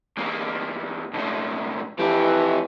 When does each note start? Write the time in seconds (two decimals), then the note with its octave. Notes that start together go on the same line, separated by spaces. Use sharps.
0.17 E2 A#3
1.13 B1 A2
1.99 F2 E3 G4